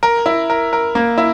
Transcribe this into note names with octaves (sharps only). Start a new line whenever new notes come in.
A#4
E4
A#4
A#4
A#3
E4